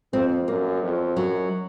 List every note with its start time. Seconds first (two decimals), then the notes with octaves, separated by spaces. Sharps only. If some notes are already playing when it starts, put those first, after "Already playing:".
0.13 F2 C4
0.48 F#2 A#3
0.83 F2
1.16 F#2 F#3